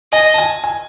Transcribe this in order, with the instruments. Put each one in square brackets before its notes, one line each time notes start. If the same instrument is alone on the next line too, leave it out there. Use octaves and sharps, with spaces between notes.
[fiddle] D#5 [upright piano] G#5
[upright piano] A5
G#5
G#5